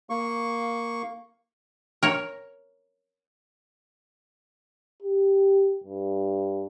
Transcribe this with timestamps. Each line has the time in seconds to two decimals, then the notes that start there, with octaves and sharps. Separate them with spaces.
0.10 A#3 C#6
2.03 A#4 C#5
5.02 G4
5.84 G2